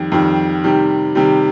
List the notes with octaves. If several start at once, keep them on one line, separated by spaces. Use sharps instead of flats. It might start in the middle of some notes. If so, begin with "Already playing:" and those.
Already playing: F2 D#3 G3
F2 D#3 G3
C3 D#3 G3
C3 D#3 G3